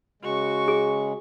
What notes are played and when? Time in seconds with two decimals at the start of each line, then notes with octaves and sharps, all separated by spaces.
0.22 C#3 G#3 F#4 C#6
0.68 G#4